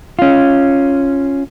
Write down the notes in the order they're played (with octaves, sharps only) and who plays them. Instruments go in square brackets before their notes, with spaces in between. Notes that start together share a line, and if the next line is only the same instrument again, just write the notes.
[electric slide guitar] C#4 F4